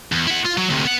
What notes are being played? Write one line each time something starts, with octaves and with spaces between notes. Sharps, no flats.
E2
E4 F#5
F4
F#3
D2 C3
B3 F#5